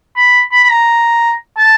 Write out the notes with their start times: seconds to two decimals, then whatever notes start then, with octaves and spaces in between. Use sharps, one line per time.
0.16 B5
0.52 B5
0.63 B5
0.69 A#5
1.58 A5